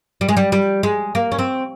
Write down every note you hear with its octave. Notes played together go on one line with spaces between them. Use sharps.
G3
G#3
G3
G3
G#3
A#3
C#4
C4